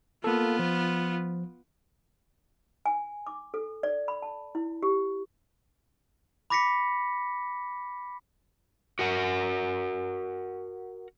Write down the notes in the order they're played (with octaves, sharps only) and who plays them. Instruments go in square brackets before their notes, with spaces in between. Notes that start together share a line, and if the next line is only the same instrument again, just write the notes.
[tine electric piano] A#3 A4 [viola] B3 F4
[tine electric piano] F3
[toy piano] G#5
D6
A4
D5
B5
A5
E4
G4
[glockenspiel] B5 D6 A#6 B6 C#7
[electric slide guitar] F#4 A#4 F#5